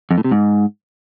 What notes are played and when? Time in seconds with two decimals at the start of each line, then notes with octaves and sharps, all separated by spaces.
0.11 F2
0.18 A2
0.24 C3
0.31 G#2